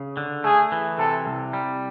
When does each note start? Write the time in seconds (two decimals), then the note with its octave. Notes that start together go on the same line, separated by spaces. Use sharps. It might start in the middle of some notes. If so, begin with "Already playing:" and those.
Already playing: C#3
0.17 D3
0.44 A3 G#4
0.72 E3
0.99 C3 A4
1.26 C2
1.53 G3